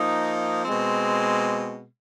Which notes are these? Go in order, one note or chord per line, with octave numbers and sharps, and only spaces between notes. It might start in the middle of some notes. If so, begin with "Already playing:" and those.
Already playing: F3 A#3 D#4
B2 G#3 C4